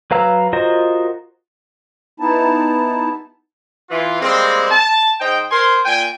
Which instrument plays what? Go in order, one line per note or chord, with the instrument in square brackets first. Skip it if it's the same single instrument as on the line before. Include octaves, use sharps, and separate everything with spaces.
[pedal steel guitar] F#3 B4 F5 A#5 E6
F4 F#4 A#4 C5 D#5
[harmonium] B3 D#4 E4 A5
[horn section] E3 F4
G3 G#3 A#3 C4
A5
G#2 D#4 C5 G5
A#4 C5 G#5 C6
A#2 G5 G#5